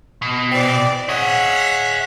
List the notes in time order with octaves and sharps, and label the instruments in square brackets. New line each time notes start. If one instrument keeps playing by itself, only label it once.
[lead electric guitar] B2
[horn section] E3 C4 D5
[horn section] G#4 C#5 F#5 [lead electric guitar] D#5 E5